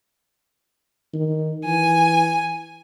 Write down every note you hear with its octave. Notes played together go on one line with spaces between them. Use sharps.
D#3
E3 G#5